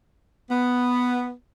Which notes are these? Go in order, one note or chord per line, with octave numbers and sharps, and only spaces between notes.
B3